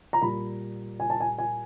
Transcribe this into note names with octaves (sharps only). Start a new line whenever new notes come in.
A#5
A#2 G3 A#3 B5
G#5
A5
G#5
G#5